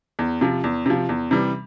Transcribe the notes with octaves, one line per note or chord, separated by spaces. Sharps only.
E2
C3 F3
E2
C3 F3
E2
C3 E3 G3